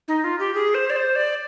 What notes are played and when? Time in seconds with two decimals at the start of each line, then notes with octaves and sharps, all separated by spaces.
0.08 D#4
0.24 F4
0.39 G4
0.55 G#4
0.75 C5
0.90 D5
0.96 C5
1.16 D5